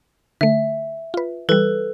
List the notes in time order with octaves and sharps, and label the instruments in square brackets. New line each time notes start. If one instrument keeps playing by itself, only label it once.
[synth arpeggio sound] D3 A3 [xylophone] E5
[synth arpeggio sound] F4 B4
[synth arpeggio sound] E3 G3 [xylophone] A4 B4